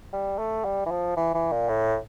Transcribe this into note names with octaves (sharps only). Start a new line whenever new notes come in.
G3
A3
G3
E3
F3
E3
E3
A#2
A2